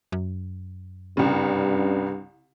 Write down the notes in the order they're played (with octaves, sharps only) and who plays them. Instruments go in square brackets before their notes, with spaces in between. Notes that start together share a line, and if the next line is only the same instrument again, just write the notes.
[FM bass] F#2
[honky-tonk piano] C2 C#3 [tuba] G2